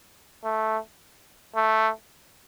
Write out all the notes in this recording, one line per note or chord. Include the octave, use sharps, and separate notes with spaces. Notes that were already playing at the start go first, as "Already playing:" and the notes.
A3
A3